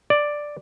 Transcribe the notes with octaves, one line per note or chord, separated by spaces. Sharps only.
D5